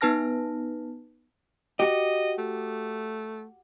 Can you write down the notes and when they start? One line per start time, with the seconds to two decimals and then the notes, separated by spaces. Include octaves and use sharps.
0.01 B3 D#4 B4 A5 F6 A#6
1.80 F#4 G4 D#5
2.39 A3